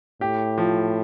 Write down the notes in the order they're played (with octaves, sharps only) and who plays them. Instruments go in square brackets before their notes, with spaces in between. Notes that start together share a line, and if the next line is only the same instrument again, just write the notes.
[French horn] A2 [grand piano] G4
[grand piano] F3